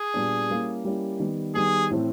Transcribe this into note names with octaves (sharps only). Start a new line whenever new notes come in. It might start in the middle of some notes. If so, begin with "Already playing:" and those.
Already playing: G#4
A#2 G3 B3 D4
G3 A#3 C#4 E4
G3 A#3 C#4 E4
D#3 G3 B3
D#3 G3 B3 G#4
A2 E3 A3 C4